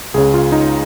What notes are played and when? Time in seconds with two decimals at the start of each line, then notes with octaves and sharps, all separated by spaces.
0.14 C#2 C#3 G#4
0.34 F4
0.52 D#4